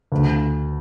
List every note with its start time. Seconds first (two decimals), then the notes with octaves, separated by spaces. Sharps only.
0.12 D2